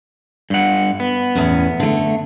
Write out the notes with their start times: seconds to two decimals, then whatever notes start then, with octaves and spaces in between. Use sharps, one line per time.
0.50 G2 F#5
1.00 B3
1.35 E2 A2 C#4
1.80 D3 A3